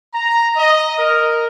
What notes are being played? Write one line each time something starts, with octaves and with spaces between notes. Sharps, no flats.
A#5
D#5
A#4